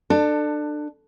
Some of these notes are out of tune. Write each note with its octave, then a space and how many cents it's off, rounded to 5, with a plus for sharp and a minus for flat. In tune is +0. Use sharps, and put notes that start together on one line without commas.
D4 +25 A4 +15